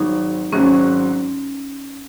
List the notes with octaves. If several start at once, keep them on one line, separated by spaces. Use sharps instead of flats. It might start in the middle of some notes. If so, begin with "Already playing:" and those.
Already playing: G#1 G#2 F#3 C4 D#4
G#1 G#2 F#3 C4 C#4